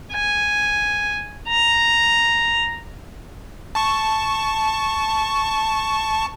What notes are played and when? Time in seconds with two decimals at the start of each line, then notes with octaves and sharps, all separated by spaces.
0.13 G#5
1.48 A#5
3.75 A5 C#6